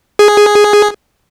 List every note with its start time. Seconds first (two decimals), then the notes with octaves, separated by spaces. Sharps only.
0.19 G#4